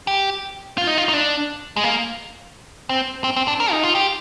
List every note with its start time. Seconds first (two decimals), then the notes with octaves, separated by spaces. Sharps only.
0.07 G4
0.78 F4
0.87 D#4
0.97 F4
1.09 D#4
1.14 D4
1.76 G#3
1.84 A#3
2.89 C4
3.24 C4
3.36 C4
3.48 D4
3.60 A#4
3.72 D#4
3.83 F4
3.95 G4